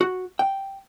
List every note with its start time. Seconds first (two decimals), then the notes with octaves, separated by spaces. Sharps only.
0.01 F#4
0.39 G5